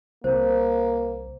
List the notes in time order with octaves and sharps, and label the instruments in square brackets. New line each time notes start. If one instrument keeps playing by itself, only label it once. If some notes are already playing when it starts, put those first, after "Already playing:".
[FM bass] C2 [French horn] A#3 [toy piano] C5